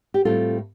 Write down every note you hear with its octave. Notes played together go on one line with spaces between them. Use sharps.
G4
A2 G3 C4 F4 A4